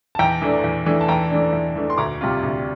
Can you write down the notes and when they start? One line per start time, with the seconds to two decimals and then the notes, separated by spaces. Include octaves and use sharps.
0.15 A5
0.19 E2 G5 A#5
0.42 E3 A3 D4
0.64 E2
0.86 E3 A3 D4
1.01 A5
1.08 E2 G5 A#5
1.31 E3 A3 D4
1.53 E2
1.76 E3 A3 D4
1.90 C6
1.98 D2 A#5 D6
2.21 C3 G3 C4 F4
2.43 D2